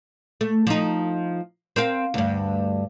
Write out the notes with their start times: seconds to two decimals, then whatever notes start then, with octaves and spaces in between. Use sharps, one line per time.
0.41 A3
0.67 F3 D#4
1.76 C4 A#4 F5
2.14 D2 G2